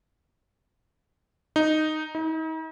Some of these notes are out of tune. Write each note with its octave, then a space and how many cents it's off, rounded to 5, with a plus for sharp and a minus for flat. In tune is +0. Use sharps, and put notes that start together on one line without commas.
D#4 -5
D#4 +40